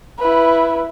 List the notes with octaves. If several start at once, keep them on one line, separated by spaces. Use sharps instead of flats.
E4 B4